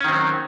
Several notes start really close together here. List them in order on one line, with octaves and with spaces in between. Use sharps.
C#4 D#3 C4 F#3